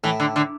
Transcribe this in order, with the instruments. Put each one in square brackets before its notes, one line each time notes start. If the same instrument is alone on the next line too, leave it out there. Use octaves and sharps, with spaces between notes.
[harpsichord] A2 [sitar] E3
[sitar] D3
D3